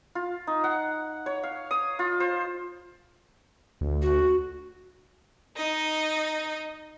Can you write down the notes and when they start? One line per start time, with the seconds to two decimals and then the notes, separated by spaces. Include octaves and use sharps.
0.15 F4
0.47 D#4
0.64 F#5
1.26 C#5
1.43 F5
1.71 D#6
1.99 F4
2.20 C5
3.81 D2
4.02 F#4
5.56 D#4 D#5